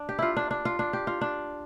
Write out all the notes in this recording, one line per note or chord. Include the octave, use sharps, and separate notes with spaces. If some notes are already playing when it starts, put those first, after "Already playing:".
Already playing: D4
G4
E4 F4
D4
D4
F4
D4
G4
F4
D4